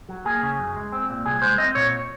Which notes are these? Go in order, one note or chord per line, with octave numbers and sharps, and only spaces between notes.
F#3
A#3 G#4
C#3
F#2
G#3
C4
A#2
C2 G#4
G#3 C5
C4 D#5
A#2 C#5